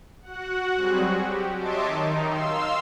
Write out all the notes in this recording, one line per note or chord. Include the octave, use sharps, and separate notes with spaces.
F#4 F#5
F#3 G3 C4 F#4 G#4
G4
C#5 D#5 E5 A5 C6 D6
D#3 D#4
F5 C6 E6